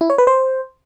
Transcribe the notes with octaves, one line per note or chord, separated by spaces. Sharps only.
E4
C#5
B4
C5